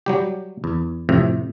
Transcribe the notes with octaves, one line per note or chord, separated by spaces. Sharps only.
F#3 G3 G4
E2
F2 A2 C3